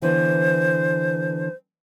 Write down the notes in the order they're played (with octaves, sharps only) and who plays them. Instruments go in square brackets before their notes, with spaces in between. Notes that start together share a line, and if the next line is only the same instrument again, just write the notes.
[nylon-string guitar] D3 E3 B3 [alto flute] C5